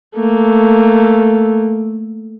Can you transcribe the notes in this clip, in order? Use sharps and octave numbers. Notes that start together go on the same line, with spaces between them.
A3 A#3